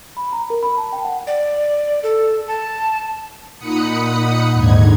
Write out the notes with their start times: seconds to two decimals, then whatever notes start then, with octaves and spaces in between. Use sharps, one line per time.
0.17 B5
0.33 A#5
0.50 A#4
0.63 B5
0.77 A5
0.93 G5
1.05 F#5
1.27 D5
2.03 A4
2.48 A5
3.58 A#2 D#4 F#5 B5 D#6 C#7
4.52 D#2 G#2 D3 D#4 G#6